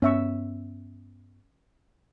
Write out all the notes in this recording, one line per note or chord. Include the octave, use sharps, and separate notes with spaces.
G2 B3 C#4 E5 C#6